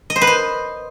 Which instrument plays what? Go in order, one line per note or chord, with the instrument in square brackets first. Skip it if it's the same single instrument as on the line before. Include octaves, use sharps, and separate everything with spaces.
[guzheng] D#5
C5
B4
C5